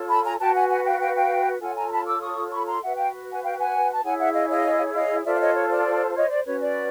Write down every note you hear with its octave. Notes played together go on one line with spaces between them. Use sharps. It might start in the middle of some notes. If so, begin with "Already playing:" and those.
Already playing: F4 A4 C#5
A5 B5
G#5 A#5
F#4 B4 G5 A5
F#5 G#5
F#5 G#5
F5 G5
F5 G5
F5 G5
F4 A4 C#5 F#5 G#5
G#5 A#5
A#5
A5 B5
D6 E6
C#6 D#6
B5 C#6
A#5 C6
F#4 B4 E5 F#5
F5 G5
F#5 G#5
F5 G5
F#5 G#5
A5
E4 G#4 C#5 F#5 G#5
E5 F#5
D#5 F5
D#5 F5
D#5 F5
F4 A4 C5 D5 E5
E5
C#5 D#5
C#5
D5
C#5 D#5
D5
C#4 F#4 B4 C#5
D5